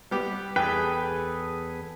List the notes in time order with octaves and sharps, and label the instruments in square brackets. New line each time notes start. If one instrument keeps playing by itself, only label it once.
[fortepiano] G3 B3 G4
[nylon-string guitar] E2 [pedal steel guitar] G#4 A4 B4 [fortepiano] G5